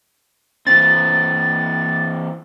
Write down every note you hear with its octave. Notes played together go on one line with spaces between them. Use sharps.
E3 C4 A6